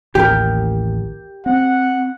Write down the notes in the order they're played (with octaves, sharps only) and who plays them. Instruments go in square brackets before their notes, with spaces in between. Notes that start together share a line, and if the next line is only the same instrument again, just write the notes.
[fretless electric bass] A1 D#2 [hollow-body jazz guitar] G4 A#4
[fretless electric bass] C4 [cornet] F#5